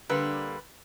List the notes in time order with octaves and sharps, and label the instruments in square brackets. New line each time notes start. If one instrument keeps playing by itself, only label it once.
[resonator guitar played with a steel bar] D3 G3 A#3 [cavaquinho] B4 C6